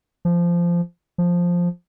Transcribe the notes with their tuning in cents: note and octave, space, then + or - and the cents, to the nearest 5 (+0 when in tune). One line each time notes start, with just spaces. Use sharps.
F3 -15
F3 +5